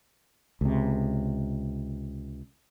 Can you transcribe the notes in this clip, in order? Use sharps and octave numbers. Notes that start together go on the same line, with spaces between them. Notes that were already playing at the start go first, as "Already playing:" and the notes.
C#2 C3